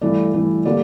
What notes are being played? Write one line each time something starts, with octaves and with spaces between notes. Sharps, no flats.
G2 E3 A3 D5
G2 E3 A3
D3 G3 A#3 D5